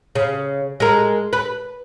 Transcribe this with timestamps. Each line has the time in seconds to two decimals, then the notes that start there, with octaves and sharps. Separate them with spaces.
0.15 C#3
0.80 G#3 A#4
1.33 B4